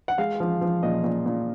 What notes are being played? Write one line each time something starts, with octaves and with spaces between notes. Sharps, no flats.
F#5
G#3 F5
F3
F3
A#2 D#5
A#2
A#2